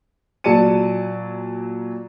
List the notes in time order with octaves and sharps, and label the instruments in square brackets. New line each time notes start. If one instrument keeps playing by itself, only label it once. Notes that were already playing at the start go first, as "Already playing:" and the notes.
[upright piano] A#2 F#3 D5 A5 C#7 D#7